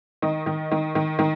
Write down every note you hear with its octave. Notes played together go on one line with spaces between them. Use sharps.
D#3 D#5
D#3
D#3
D#3
D#3